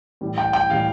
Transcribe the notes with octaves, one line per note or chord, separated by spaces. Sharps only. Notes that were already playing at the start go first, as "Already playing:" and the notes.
A2 E3 G3
G5
G5
A2 E3 G3 F5